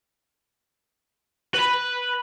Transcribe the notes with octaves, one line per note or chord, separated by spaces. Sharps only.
B4 B5